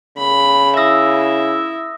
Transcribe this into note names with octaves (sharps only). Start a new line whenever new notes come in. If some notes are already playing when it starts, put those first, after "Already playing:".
C#3 B5
E4 E5 D#6 E6 A#6